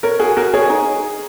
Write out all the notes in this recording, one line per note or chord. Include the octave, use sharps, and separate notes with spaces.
A#4 C#5
F#4 G#4
F#4 A#4
G#4 C#5
D#4